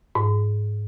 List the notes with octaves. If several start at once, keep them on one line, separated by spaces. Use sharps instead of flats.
G#2